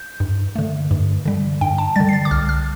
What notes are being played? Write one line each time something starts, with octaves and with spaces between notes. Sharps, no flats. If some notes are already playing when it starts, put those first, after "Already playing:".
Already playing: G6
G2
D3 A3
G2
D3 G3
G2 G5
A5
D3 G3 A6
C7
A6
D6
C2 F6
F6